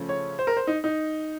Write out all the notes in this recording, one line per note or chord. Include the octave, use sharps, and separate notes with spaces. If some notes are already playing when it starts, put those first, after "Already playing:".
Already playing: C#3 F3 A3 C#4
C#5
C5
A#4
C5
D#4
D#4